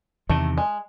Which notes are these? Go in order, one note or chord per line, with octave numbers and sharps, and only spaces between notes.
E2 C3 D#3 A3
G#3